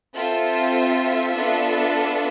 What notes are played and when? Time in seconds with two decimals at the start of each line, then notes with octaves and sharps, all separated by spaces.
0.16 C4 F4 A4 E5
1.35 B3 D4 F4 A4